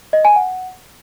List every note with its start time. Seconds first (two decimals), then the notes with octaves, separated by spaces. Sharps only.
0.13 D#5
0.25 G#5
0.36 F#5